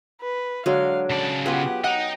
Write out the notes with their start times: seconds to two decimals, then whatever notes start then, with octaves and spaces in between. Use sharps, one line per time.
0.21 B4
0.66 D3 F#3 G#3 F5
1.10 C#3 D5 A5
1.46 B3 F4 G4 G#4 B4 F#5
1.84 D#5 F#5 G5 A#5